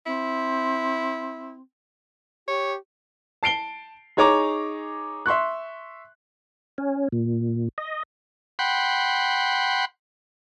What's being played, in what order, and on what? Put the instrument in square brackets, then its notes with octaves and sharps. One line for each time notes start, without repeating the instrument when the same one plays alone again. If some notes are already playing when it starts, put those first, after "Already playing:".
[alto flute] C4 [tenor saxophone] E4
[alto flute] G4 [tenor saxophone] C#5
[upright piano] A5 C7 D7 G7
D#4 G#4 C#5 A#5 D6
E5 C6 C#6 F#6
[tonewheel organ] C#4
A#2
D#5
[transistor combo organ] F#5 G5 B5 C6